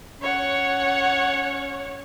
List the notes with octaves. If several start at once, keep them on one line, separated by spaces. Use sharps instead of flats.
C#4 C#5 F#5